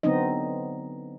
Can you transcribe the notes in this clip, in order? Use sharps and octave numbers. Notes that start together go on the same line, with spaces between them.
D3 F#3 B3 C4 D#4 D#5